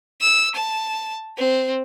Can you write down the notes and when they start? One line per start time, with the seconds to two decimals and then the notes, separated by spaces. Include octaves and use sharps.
0.21 E6
0.55 A5
1.38 C4